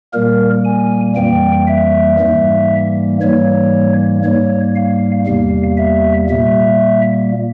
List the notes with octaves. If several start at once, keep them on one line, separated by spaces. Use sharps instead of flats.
A#2 G3 A#3 A#4
G#5
F2 E3 G3 A#3 G5
E5
G#2 E3 G3 A#3
G#2 E3 G3 A#3 C#5
G#2 G3 A#3 C#5
F5
E2 C3 G3 A#3 F5
E5
A#2 G3 A#3 E5